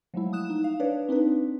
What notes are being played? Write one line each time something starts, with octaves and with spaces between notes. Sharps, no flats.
F3 F#3 G#3 A3 E4
D#6 F#6 E7
D#4
F5
D4 B4 C#5 D5
C4 D4 D#4 B4